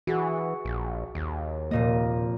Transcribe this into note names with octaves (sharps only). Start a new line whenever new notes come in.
E3 F#4 G#4
A#1
D#2
F1 A#2 A#3 D#5